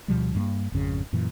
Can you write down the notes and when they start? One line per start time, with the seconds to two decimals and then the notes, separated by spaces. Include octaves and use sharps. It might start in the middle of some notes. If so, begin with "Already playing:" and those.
0.08 D2 B2 F3 G3
0.35 G2 G#3 A#3
0.72 G#1 F2 C#3
1.13 F#2 A#2 E3